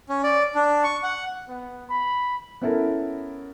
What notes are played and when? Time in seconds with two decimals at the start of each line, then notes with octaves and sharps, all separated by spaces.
0.09 C#4
0.24 D5
0.55 D4
0.84 C#6
1.03 F#5
1.49 B3
1.90 B5
2.62 B3 C#4 E4 A4 A#4